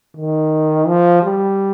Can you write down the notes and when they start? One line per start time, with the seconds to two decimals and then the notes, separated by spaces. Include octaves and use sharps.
0.17 D#3
0.87 F3
1.23 G3